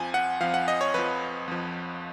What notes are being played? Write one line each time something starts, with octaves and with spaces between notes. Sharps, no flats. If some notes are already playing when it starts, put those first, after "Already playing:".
Already playing: F2 F3 G#5
F#5
F2 F3 F5
F#5
D#5
C#5
F2 F3 B4
F2 F3